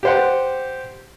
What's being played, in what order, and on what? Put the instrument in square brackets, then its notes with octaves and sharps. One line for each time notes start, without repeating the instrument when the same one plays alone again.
[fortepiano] G4 C5 F#5